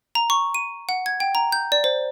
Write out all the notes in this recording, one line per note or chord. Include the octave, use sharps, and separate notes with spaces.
A#5
C#6
D#7
F#5
G#6
G5
A#5
G6
D5
C5